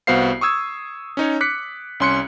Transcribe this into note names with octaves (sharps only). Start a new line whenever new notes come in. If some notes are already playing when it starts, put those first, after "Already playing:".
C2 B3 F#4 C5 F5 C7
C#6 D#6 E6 G#6
C#4 D#4 C#5
D6 F#6 B6 C#7
C2 C#4 C6 F#6 C#7